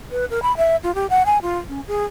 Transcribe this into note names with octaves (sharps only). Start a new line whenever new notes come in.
B4
A#4
B5
E5
F4
G4
F#5
G#5
F4
C#4
G#4